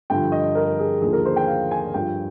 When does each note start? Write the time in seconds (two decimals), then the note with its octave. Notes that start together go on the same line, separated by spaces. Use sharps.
0.10 G2 D3 F3 G5
0.32 D#5
0.55 A#4
0.79 G#4
1.02 D#2 D3 F3 G#4
1.13 A#4
1.25 C5
1.36 G5
1.47 F5
1.71 G#5
1.94 G2 F3 G5